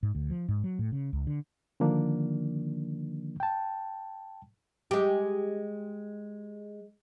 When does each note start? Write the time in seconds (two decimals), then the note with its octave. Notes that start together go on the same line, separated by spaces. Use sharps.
0.03 G#2
0.15 D2
0.30 F3
0.48 G#2
0.64 F#3
0.79 A2
0.92 C#3
1.13 C#2
1.27 D3
1.80 D3 D#3 F3 A#3 D4
3.40 G5 A5
4.91 G#3 G4